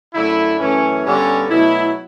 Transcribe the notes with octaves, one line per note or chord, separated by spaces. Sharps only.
F#2 D3 A3 E4
F#2 E3 A3 C#4
G2 D3 G3 B3 C#4
B2 F#3 A3 E4